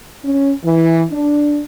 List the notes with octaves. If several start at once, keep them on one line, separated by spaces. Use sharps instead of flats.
C#4
E3
D4